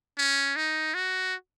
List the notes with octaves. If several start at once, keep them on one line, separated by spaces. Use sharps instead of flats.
C#4
D#4
F#4